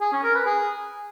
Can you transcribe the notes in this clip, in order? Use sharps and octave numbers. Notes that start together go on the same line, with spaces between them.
G#4
C#4
A#4
B4
G#4